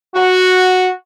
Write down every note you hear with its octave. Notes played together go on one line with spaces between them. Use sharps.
F#4